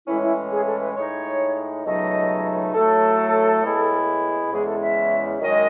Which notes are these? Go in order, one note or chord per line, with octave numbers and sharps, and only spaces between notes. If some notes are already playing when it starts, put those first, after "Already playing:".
A2 E3 G#3 C#4 E4
E4
G#4
A4
B4
A2 G#3 D#4 C#5
C#2 B2 F#3 A3 D#4 D#5
A2 F#3 A3 A4
A2 G#3 B3 E4
E2 C#3 G#3 C#4 E4 G#4
A4
E5
F#2 D#3 G#3 C#4 D#5